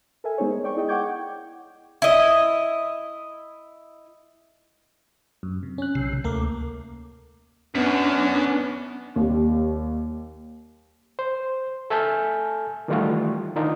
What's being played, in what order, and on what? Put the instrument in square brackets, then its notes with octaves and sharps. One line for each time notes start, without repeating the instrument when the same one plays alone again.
[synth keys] A4 A#4 E5 G#5
G#3 B3 D#4 G#4 C5 C#5
A#4
D5 G5 C#6
E4 G#4 D#5 G5
F#5 G5 C#6 D6 G6 G#6
[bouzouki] E4 D#5
[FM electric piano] F#2
C3
C#4 F#6
[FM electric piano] B1 [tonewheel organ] C3
[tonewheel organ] D2 [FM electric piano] A3 A#3 A#4
[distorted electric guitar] F#2 [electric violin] B3 [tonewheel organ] C#4 D4
[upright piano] D#2 G3
[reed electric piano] C5
A4 E5 G#5 A5 F6 G6
D#3 E3 G3 A3 F4 F#4
D#3 D4 D#4 F4